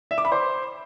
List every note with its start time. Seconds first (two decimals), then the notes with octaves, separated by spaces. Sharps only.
0.11 E5
0.18 D6
0.25 B5
0.32 C5